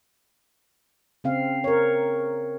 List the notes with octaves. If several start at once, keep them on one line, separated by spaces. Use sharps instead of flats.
C#3 C4 F5
A#4 C#5